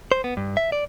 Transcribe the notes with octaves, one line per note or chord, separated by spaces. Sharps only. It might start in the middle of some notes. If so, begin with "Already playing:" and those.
C5
B3
G2
E5
D5